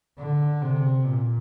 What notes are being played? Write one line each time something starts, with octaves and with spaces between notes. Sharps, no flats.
D3
C3
A#2